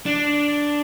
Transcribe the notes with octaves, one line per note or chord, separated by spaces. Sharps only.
D4